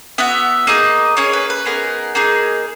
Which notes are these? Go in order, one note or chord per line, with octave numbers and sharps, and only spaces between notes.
B3 F#4 E5
A#3 D#4 G#4 D#5
A#3 C#4 G#4 C#5
B4
B4
B3 D#4 G#4 A#4
A#3 D#4 G#4